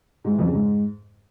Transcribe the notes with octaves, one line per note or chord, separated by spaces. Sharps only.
G#2
E3
F2
C#3
G#2